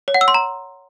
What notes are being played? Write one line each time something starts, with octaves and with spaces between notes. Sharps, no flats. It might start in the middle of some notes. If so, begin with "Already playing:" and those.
C#5
F#5
E6
C6
A#5